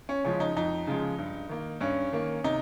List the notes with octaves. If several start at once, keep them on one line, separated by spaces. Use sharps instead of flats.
C#4
C#3 F3 G#3 C#4
D#4
F2 D#4
C#3 F3 G#3
G2
D#3 A#3
G2 C#4
D#3 A#3
C3 D#4